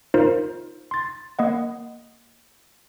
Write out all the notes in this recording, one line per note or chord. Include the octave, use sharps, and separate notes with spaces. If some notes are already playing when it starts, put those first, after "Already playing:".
D#4 F4 A#4 C5
C6 A6
A#3 D#5 F#5